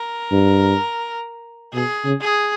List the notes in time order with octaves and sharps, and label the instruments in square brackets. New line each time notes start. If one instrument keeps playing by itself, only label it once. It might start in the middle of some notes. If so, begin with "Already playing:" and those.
Already playing: [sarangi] A#4
[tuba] G2
[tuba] B2 [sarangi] G#4
[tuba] C#3
[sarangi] G#4